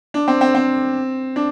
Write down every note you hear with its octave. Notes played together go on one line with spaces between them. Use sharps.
D4
C4
C4
C4
D4